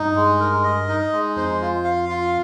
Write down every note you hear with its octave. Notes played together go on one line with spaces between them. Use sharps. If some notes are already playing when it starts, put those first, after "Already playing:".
Already playing: G2 D#4
G#3
A#4
D#5
D#4
G#3
F2 C5
F4
F5
F4